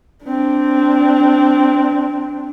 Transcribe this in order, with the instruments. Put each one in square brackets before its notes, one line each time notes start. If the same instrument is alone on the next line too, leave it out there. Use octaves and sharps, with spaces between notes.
[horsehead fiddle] C4 D4